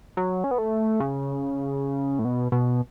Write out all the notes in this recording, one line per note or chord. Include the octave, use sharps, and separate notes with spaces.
F#3
C#4
B3
A3
C#3
A2
B2
B2